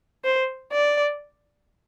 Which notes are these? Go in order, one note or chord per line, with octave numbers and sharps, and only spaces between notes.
C5
D5